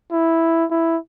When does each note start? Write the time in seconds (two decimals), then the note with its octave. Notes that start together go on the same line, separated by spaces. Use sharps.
0.12 E4
0.71 E4